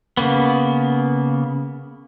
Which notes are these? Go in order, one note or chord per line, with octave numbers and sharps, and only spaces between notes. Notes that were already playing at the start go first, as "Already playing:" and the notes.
C#3 A#3 B3